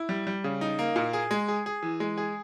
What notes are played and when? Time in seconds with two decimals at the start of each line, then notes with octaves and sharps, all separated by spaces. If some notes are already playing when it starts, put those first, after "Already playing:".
Already playing: E4
0.09 G3
0.27 G3
0.44 C#3
0.61 D#4
0.79 A#3
0.96 A#2
1.13 G#4
1.31 G#3
1.48 G#4
1.66 G#4
1.83 E3
2.00 G#3
2.18 G#4